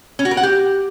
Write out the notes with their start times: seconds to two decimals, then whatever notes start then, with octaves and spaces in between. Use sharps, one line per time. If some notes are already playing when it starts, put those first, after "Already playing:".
0.19 C#4
0.25 F#4
0.31 A#4
0.37 F#5
0.43 G4